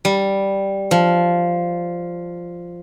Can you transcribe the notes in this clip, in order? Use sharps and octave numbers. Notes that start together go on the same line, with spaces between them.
G3
F3